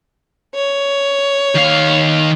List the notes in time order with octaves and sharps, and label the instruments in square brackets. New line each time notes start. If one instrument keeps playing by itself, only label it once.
[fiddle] C#5
[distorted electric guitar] D#3 F5